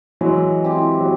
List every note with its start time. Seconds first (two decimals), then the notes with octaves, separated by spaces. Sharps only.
0.21 E3 F#3 G#3
0.64 C4 E4 G4
1.00 F#3